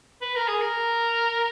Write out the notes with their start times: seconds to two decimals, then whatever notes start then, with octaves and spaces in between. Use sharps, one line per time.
0.22 B4
0.35 A#4
0.48 G#4
0.62 A#4